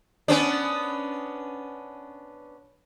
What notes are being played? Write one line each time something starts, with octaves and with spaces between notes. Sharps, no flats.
B3 C#4 D4